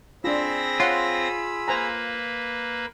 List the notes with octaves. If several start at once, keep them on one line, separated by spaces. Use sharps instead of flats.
C4 D4 F4 G#4 B5 E6 A#6
F4 C#5 F#5 C6
A#3 B4 C5 G#5 A#5